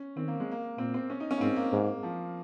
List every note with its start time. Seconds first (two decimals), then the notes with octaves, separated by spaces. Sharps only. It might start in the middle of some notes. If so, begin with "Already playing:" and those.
Already playing: C#4
0.16 D#3 C4
0.28 A#3
0.40 G#3
0.51 A#3
0.78 A#2 C4
0.94 C4
1.10 C#4
1.20 D#4
1.31 C#4
1.37 A#3
1.41 G#2 C4
1.56 A#3
1.72 G#2
2.03 F3